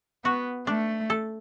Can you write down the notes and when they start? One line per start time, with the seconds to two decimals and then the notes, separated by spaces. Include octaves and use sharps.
0.25 B3 F#4
0.67 A3 D4
1.10 A4